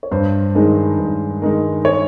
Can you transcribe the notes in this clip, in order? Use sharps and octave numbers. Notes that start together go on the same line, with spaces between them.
C#5
G2 C5
D#3 G#3 D#4
G2
D#3 G#3 D#4
C#5